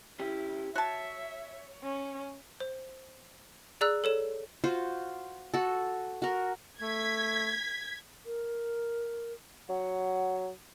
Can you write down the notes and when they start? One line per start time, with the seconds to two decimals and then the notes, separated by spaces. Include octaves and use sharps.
0.19 C#4 E4 G4
0.75 F#4 C#5 E5 A5
1.83 C#4
2.60 C5
3.81 G#4 D5 A#5 E6 F#6
4.04 A4 C#5 E7
4.64 F4 F#4 C5
5.54 F#4 A4
6.22 F#4 A#4
6.81 A3 G#6 B6
8.25 A#4
9.69 F#3 F#5